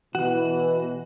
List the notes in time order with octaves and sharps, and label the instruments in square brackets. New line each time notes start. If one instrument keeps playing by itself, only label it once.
[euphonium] B2 [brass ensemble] E3 [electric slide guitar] F#4